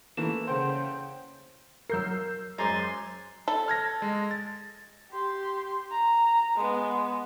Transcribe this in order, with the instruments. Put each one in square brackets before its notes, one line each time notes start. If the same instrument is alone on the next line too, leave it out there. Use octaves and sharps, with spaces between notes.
[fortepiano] E3 A3 A#3 [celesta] E7
[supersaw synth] C#3 G5 [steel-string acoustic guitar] C5 F#5 A5 [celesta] C6
[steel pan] F#3 A#4 [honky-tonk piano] E6 G6 C7
[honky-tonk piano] F#2 G#3 C5 [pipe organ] G#5 C6 A6 [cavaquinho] A#5 D6
[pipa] A4
[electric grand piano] F6 G#6 A#6
G#3
A6
[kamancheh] G4 C6
A#5
G#3 B3